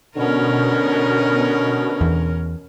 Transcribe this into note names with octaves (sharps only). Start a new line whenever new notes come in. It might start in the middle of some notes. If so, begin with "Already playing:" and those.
B2 D3 C#4 A#4
E2